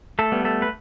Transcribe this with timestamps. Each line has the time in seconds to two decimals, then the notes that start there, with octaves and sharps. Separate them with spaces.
0.19 A3 A4
0.32 G3 B3
0.45 A3 A4
0.62 B4